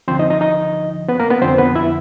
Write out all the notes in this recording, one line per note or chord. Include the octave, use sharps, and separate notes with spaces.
D2 D3 F3 C4 C5
D#4 D#5
D#4 D#5
D#4 D#5
B3 B4
A#3 A#4
B3 B4
F2 D3 F3 C4 C5
B3 B4
E4 E5